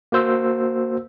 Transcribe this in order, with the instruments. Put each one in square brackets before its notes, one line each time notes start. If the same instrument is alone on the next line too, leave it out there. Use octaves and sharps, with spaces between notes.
[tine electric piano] A#3 F#4 C5 E6